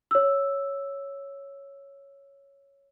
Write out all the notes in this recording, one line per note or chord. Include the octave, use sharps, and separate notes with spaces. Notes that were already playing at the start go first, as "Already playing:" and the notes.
C#5 E6